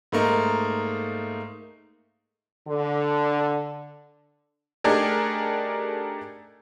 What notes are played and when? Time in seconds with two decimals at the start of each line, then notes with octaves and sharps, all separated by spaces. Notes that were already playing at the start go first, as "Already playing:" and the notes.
0.12 G#2 A3 A#3 D#4
2.68 D3
4.84 A3 D4 D#4 G4 G#4 A#4